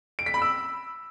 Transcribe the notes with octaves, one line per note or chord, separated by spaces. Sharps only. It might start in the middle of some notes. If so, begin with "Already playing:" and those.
D7
B6
B5
E6